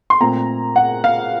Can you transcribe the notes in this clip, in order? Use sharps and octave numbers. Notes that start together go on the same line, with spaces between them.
C6
A#2 A3 C4 A#5
F#5
F5